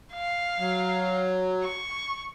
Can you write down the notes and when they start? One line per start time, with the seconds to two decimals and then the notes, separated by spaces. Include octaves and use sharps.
0.14 F5
0.59 F#3
1.63 C#6